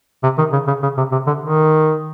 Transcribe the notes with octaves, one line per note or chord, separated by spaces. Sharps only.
C3
D#3
C#3
C#3
C#3
C3
C3
D3
D#3